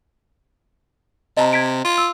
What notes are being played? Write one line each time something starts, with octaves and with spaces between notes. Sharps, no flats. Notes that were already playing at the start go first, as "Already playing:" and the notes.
C3 D#5 A5 A#5
G#6 B6 D7
F4
E6